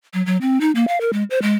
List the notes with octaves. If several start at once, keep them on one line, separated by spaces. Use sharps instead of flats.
F#3
F#3
C4
D#4
A#3
F5
A#4
G#3
C5
G#3